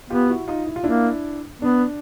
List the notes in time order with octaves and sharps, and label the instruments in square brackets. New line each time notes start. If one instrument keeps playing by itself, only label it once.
[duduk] B3 [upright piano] F4 G4
[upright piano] E4 F#4
D#4 F4
E4
F4
[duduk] A#3 [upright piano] D4 E4
[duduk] B3 [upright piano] D4